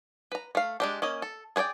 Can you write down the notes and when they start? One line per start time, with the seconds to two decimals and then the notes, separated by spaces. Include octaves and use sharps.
0.32 B4 A#5
0.55 A3 F5
0.80 G#3 D4 G4
1.02 A#3 C#4 D#5
1.22 A4
1.56 G#4 B4 C#5 D5 G5